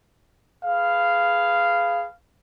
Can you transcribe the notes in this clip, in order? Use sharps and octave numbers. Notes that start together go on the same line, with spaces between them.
G#4 B4 F5